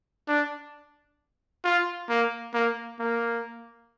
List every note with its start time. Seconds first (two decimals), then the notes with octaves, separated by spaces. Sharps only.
0.28 D4
1.64 F4
2.09 A#3
2.54 A#3
3.00 A#3